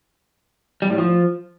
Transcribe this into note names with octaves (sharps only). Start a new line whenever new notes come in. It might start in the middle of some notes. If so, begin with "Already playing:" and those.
G3
A2
F3